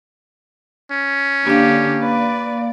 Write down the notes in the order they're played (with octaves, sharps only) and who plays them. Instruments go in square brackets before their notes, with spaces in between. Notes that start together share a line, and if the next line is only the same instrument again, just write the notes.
[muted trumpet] C#4
[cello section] D3 D4 [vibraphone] A#3 F5 [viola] G4
[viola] B4 [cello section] D5